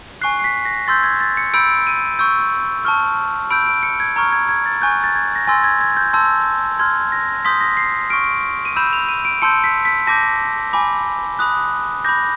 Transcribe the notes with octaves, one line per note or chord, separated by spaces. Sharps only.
G#5 C#6 F#6 C7
C7
B6
A#6
C6 E6 G6 A6
G#6
A6
C#7
B5 E6 G6 D7
D#7
C#6 E6 G6
A5 C#6 F6
B5 E6 G6 D7
D7
C#7
G#6
A#5 C#6 F6 G#6
G#6
G#6
A6
G#5 C#6 F#6 G6
A6
G#6
A#6
G#5 C6 E6 A6
A6
G#6
G#6
G6
A5 C6 E6 G6
C6 F6 G#6
A#6
C6 D#6 G6 B6
A#6
C7
C#6 F6 D7
D#7
B5 E6 G6 E7
F7
D#7
D7
A5 C6 E6 G6 C#7
B6
B6
A5 D6 G6 A#6
G#5 B5 D6
B5 D#6 F#6
B5 D6 G6 A#6